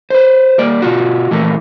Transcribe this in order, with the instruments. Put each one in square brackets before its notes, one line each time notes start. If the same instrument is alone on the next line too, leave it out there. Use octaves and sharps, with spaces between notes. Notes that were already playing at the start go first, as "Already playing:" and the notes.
[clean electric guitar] B4 C5
G3 A#3 D5
B2 F4 F#4
A#2 E3 A3 A#3